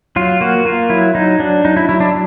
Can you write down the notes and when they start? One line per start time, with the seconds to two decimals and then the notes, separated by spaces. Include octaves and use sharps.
0.16 F#3 F4
0.41 A#3 F#4
0.65 A#3 F4
0.90 F#3 E4
1.15 F#3 D#4
1.39 F#3 D4
1.65 F#3 D#4
1.77 E4
1.89 F#3 E4
2.00 D4